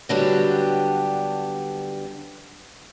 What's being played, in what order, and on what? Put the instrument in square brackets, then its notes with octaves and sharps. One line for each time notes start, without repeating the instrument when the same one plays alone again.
[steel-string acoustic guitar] D3 F#3 G3 B3 D4 G4